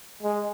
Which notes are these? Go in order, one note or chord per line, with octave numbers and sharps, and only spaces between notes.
G#3